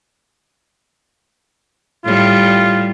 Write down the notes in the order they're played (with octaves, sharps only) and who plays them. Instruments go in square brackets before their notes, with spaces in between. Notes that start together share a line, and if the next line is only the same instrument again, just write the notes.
[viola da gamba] A2 G3 [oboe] F4